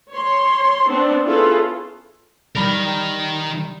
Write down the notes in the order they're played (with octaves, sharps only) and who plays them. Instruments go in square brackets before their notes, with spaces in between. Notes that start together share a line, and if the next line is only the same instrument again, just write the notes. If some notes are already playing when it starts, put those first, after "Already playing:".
[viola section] C#5 C6
B3 C4 D4
C#4 E4 F4 G#4 A4 B4
[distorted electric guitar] D#3 A#4 [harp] G3 B5